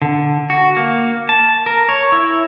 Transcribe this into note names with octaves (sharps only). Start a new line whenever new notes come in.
D3
F#4
A#3
A5
A#4
C#5
E4